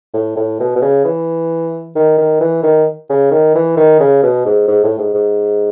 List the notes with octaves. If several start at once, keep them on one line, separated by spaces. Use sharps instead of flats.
A2
A2
B2
B2
C#3
E3
D#3
D#3
E3
D#3
C#3
D#3
E3
D#3
C#3
B2
G#2
G#2
A2
G#2
G#2